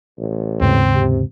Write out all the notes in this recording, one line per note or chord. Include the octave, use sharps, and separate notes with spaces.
A1
D#2 G#2 C#3 C4
C3